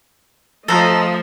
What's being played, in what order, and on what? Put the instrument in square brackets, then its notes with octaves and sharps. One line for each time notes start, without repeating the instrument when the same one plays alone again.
[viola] F3 [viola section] A3 D#5 [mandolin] A4 A#5